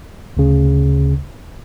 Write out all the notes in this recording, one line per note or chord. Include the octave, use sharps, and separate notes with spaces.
D2 C#3